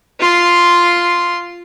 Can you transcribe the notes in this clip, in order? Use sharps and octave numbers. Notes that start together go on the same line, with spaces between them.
F4 C6